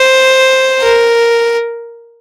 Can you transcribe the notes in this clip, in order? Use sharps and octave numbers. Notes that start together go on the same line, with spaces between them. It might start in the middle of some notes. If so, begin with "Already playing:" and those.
Already playing: C5
A#4